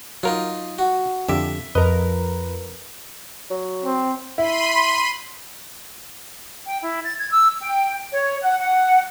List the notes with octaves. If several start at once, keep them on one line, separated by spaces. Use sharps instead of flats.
F#3 D#4 F4 A#4
F#4
F2 D3 G4 E5
F2 A#4 B4 D#5
F#3
C4
E4 B5 C6 D#7
G5
E4
A6
G#6
E6
G5
C#5
F#5
F#5